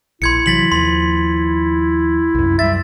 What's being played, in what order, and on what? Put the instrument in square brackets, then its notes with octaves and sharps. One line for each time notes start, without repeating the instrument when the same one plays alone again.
[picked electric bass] A#1 [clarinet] E4 [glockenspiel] C6 G#6 C#7
[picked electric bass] C3 E3 F#3 [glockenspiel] A6 B6 F#7
[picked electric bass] D#2 F3 [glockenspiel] C6
[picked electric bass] C2 F#2
[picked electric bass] F#2 F#3 G3 [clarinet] E5 [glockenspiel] A6